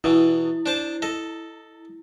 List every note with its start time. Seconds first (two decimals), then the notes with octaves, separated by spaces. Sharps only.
0.04 B2 E3 E4
0.66 D4 C5 A5
1.02 A4 D#5